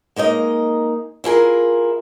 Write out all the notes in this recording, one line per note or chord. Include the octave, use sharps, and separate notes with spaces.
G#3 A#3 D#4 D#5
E4 F4 G#4 A#4